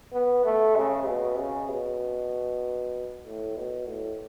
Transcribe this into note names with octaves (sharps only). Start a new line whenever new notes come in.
B3
A3
C#3
B2
C#3
B2
A2
B2
A2